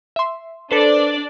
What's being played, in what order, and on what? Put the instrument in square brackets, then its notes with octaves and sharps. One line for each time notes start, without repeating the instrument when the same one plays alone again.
[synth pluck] E5 C6
[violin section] D4 D5 [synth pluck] A4 B4 C5